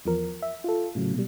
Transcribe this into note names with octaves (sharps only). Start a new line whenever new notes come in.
E2 F3 A#4
E5
F4 A4
A2 C#3 F#3
B2 G3